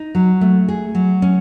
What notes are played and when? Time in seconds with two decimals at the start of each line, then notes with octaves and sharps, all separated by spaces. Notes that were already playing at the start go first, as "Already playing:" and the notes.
Already playing: D#4
0.15 F#3
0.41 A3
0.68 G#4
0.95 F#3
1.22 C#4